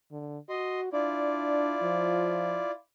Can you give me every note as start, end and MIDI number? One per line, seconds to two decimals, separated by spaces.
0.11 0.38 50
0.49 0.92 66
0.49 0.80 75
0.49 0.80 84
0.93 1.77 62
0.93 2.71 64
0.93 2.71 65
0.93 2.71 74
1.83 2.61 53